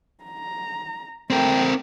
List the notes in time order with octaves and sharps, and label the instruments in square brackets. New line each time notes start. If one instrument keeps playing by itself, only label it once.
[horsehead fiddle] A#5
[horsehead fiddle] A3 G5 [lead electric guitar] C4 A#4